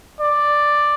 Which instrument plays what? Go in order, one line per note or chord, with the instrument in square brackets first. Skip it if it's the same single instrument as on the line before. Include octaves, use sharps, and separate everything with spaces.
[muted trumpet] D5